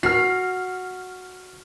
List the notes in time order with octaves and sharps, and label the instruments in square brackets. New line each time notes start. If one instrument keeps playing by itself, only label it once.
[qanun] F#4 [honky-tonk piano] F6 C7